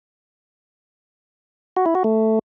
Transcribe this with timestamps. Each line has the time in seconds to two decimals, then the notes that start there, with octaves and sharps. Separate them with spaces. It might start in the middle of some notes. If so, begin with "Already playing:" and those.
1.77 F#4
1.86 E4
1.95 F#4
2.04 A3